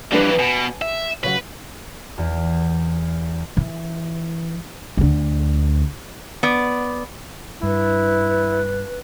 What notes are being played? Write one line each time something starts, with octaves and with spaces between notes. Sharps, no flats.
F2 E3 G3 D4 B4
B2 G#5
E5
C#3 F#3 B4
E2
E3
D2 D3
B3 D5
G2 E4 B4